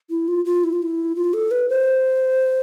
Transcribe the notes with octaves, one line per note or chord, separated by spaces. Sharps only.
E4
F4
F4
E4
F4
E4
F4
A4
B4
C5